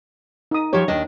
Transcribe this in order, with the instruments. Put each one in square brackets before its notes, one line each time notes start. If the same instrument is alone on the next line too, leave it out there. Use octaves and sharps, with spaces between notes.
[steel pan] D#4 D#6
[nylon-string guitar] F3 G4 [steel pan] C#5
[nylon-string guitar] D#2 D4 D#5